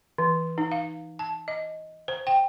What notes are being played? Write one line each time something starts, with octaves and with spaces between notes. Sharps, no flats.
E3
D#4
F5
A5
D#5
C5
G5